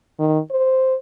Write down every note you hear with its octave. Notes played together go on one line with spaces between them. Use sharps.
D#3
C5